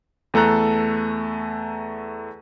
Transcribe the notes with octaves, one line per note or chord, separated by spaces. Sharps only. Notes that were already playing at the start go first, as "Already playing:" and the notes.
E2 A3 A4 A#5 F#6